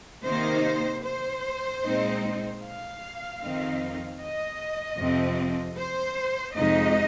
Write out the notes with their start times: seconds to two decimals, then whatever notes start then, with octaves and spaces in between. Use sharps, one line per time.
0.25 C3 D#3 A#3 D#4 C5
1.05 C5
1.83 A#2 G#3 C4 D#4
2.62 F5
3.40 F2 D#3 C4 D#4
4.20 D#5
4.98 F2 C3 F3 C4
5.77 C5
6.56 F2 C3 G#3 D#4 D#5